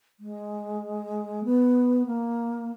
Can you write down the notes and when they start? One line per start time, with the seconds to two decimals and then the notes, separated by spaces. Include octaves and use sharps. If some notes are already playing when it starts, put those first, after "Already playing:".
0.20 G#3
1.44 B3
2.06 A#3